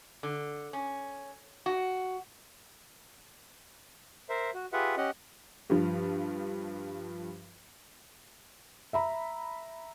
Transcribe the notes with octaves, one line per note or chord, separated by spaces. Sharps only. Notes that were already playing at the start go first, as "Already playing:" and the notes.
D3
C#4
F#4
A#4 C5 E5
F#4
F4 G4 G#4 B4 E5 F#5
C#4 G4 D#5 F#5
G2 F3
E5 A#5 B5